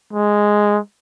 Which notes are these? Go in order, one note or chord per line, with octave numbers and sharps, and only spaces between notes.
G#3